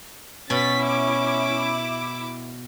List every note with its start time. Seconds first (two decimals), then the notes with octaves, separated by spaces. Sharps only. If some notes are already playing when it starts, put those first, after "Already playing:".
0.50 B2 C#4 A6 B6
0.79 E4 D6